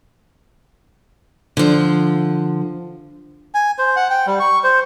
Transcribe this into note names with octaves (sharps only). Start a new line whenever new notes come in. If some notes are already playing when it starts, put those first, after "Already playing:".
D3 F3
G#5
C5
F#5
G5
G3
C#6
C5